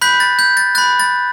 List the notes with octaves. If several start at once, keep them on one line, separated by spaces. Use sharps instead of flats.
B5 F#6 G6 B6
A6
G6
A6
B5 F#6 A6
A6